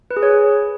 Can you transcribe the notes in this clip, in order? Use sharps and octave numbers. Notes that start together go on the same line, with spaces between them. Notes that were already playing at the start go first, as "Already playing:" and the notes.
B4
G#4
C#5